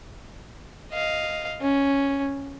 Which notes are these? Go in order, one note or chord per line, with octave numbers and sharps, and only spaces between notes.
D#5 F5
C#4